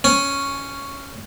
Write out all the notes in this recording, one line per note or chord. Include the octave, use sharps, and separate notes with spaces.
C#4